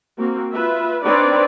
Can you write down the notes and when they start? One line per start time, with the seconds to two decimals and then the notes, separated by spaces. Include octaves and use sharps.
0.18 A#3 C4 F#4
0.52 F4 B4 E5
1.04 C4 D4 D#4 B4 C#5 D5